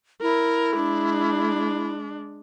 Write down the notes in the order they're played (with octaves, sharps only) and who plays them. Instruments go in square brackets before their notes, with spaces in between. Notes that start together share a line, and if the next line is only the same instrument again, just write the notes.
[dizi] E4 [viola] A#4
[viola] G#3 D4